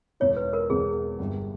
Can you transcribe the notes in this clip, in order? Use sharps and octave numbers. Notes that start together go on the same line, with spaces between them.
E1 E2 D#3 C#5
B4
A#4
E1 E2 D#3 G#4
G1 G2 G3